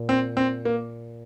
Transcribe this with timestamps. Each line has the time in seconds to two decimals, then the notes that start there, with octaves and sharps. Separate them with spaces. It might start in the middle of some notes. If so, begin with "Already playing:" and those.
Already playing: A#2
0.09 C4
0.37 C4
0.65 A#3